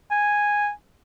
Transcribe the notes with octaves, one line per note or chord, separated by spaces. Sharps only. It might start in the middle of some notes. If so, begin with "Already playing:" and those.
G#5